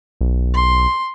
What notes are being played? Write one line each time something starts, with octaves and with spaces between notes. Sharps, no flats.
B1
C6